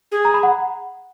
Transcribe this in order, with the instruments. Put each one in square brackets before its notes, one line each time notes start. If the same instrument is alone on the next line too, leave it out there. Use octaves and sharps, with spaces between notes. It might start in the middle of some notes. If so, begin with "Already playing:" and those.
[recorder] G#4
[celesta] A#5
B5
F#5